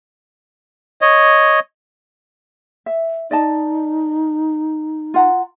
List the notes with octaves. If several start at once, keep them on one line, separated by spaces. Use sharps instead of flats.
C#5 D#5
E5
D#4 D5 D#5 A5
F4 F#5 A#5